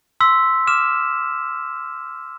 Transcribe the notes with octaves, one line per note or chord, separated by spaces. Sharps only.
C6 E6 B6
D6 F6 E7